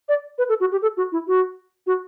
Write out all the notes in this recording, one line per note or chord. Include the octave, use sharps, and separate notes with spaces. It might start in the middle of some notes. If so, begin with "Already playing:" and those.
D5
B4
A4
F#4
G4
A4
F#4
E4
F#4
F#4